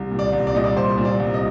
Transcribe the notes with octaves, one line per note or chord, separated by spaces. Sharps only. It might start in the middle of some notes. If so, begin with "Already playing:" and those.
Already playing: C2
A#2
D5
C2
D5
A#2 D#5
D5
C2 C5
A#2
D5
C2
D#5